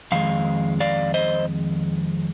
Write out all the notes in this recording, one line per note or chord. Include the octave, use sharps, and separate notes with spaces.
F2 D#3 G#3 F5
D5 F5
C5 D#5